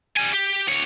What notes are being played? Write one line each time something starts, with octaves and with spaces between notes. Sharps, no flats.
G3 G#5
G4
D2 C#5